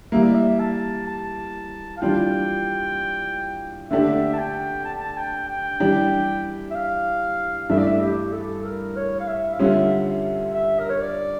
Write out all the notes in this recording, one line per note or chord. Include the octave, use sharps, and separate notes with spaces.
E3 G3 A#3 E5
D5
E5
A5
A5
F5
E3 G3 D4 F4 G5
D3 A3 D4 G4 E5
A5
G5
A5
A5
G5
G5
E3 G3 D4 G4
E5
F5
G2 E3 A3 D4 E5
D5
E5
G4
A4
A#4
C#5
F5
E5
F5
D3 G3 C#4 F4 E5
E5
E5
A#4
C#5
D5